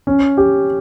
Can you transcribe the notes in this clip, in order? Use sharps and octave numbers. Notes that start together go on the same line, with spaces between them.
C#4
G4